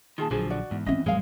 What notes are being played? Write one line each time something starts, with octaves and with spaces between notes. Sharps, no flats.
A#2 D#3 F4 G#4 A5
A#1 D3 F3 F#3 F#4 G#4 C5
F#4 D5
E2 G#2
E2 C4 C#4 D#5 E5
A1 F2 G3 G#3 G#4 A#4 F5